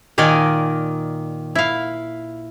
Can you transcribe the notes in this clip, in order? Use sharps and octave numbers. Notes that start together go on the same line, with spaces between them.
A#2 D#3 A#4 D5 D#5 G#5
E4 F5